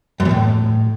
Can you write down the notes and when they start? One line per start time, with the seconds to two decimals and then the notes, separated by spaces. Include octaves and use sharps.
0.20 F#2
0.25 E2
0.31 A2